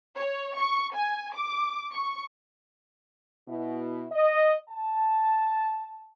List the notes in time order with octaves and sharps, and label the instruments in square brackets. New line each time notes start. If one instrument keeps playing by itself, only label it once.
[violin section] C#5
C#6
G#5
D6
C#6
[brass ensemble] B2 E4
D#5
A5